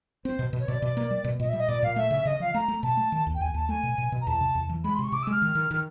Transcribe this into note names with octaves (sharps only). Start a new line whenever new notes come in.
C4 C5
B2
B2
C#5
B2 D5
B2 D5
A#3
G3
B2
A#2 D#5
E5
G3 D#5
A#2 D5
A#2 F5
A3 E5
C#3 E5
C#3 D#5
F3 F5
A3 A#5
A3
B2 A5
A3
D#3
D#2
G5
D#2 G#5
D#2 A5
A3 G#5
B2
B2
B2
A#5
E2 A5
C3
E2
E3
G#3 B5
C6
C3
C#6
C3 D6
E6
G#3 F6
D#3
D#3
D#3